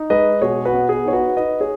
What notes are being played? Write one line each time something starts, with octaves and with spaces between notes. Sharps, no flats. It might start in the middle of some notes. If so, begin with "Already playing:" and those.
Already playing: D#4
G#3 B4 D#5
B2 G#4 C#5
F#4 B4
B3
G#4
D#4 C#5
F#4 B4
D#4 B4 D#5
G#4 C#5